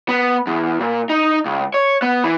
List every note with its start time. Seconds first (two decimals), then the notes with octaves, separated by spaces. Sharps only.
0.09 B3
0.47 E2
0.80 A#2
1.09 D#4
1.46 C#2
1.74 C#5
2.02 B3
2.24 E3